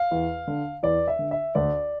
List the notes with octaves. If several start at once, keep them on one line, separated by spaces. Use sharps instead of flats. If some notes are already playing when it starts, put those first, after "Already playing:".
Already playing: F5
E2
D3
E2 D5
E5
D3
E5
D2 D5